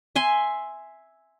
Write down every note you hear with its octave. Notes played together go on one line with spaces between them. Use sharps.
E5 G#5 C6